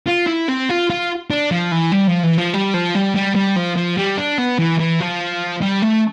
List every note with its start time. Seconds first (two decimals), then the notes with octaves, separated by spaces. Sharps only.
0.08 F4
0.28 E4
0.49 C4
0.69 F4
0.90 F4
1.31 D4
1.51 F3
1.72 E3
1.92 G3
2.07 F3
2.23 E3
2.38 F3
2.54 G3
2.74 F3
2.95 G3
3.15 G3
3.36 G3
3.56 F3
3.76 F3
3.97 G3
4.18 D4
4.38 B3
4.58 E3
4.79 E3
5.00 F3
5.62 G3
5.82 A3